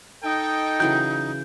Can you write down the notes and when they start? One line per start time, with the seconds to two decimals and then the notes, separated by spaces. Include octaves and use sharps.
0.24 D#4 A4 D#5 G5
0.80 C#3 E3 F#3 G6